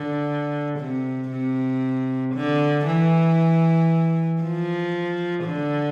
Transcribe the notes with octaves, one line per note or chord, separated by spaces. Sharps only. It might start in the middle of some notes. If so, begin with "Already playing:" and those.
Already playing: D3
C3
C3
D3
E3
F3
D3